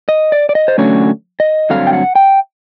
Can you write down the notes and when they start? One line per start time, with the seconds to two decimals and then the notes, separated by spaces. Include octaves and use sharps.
0.09 D#5
0.32 D5
0.49 D5
0.55 D#5
0.68 C5
0.78 D3 F#3 A3 C#4 C#5
1.40 D#5
1.70 G2 D3 F#3 A3 C4 F5
1.87 G5
1.93 F#5
2.15 G5